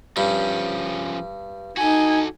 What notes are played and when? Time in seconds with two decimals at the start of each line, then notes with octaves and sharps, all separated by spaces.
0.17 G2 F3 C#4
1.77 D#4 F#4 A4 G#5